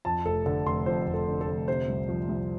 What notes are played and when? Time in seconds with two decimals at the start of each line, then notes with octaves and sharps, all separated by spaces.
0.05 F2 A5
0.26 F1 A4
0.46 D3 A4
0.66 F1 C6
0.86 F2 C5
1.07 F1
1.13 A4
1.27 D3
1.41 A4
1.47 F1
1.68 C3 C5
1.88 C2
2.09 F3
2.29 C2